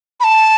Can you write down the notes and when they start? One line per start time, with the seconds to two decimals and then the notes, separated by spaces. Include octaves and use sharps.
0.20 B5
0.24 A5